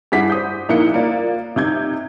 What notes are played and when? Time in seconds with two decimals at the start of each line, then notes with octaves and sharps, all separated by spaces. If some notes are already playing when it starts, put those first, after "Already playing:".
0.12 G2 E4 G#4 F#5 D6 B6
0.30 C5 D#6 G6
0.69 A#1 A#3 D#4 E4 F#6 C#7
0.94 A#3 F4 D5
1.56 C3 D#4 G6 G#6